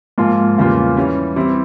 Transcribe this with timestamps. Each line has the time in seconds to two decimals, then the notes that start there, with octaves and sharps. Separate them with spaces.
0.18 G#2 F3 A#3 F4
0.58 E2 C#3 G3 A#3 F4
0.97 E3 G3 C#4
1.36 E3 G3 C4 E4